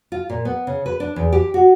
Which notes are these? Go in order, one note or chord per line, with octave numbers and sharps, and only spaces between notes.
F4
A#2
B3
C#3
B4
D4
E2
G4
F#4